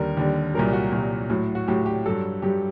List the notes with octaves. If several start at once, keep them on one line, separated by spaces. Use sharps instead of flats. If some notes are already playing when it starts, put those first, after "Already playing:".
Already playing: D#2 D3 G3 A#4
D#2 D3 G3
C2 A#2 F#3 A#4
F#4
C2 A#2 F#3
A2 F#3
F#4
A2 F#3 G4
G4
G2 F#3 A4
G2 F#3 G4